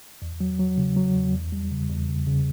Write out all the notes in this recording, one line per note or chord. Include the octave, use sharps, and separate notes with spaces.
E2
F#3
F#3
C#3
F#3
E2
E2
G3
C#3
E2
C#3
C#3